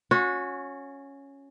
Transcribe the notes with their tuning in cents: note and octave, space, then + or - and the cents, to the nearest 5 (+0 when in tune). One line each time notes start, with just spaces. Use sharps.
C#4 +0 F#4 -30